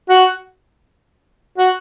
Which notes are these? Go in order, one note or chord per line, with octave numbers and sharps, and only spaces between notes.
F#4
F#4